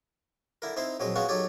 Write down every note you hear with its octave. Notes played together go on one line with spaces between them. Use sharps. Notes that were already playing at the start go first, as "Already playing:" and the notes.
D3 E4 A#4
C4 D#4 E4 C5
A#1 F#3 G#3 C4 D#5
G#3 B3 C#4 F4 F#4
F#3 D#4 G4 A4 C#5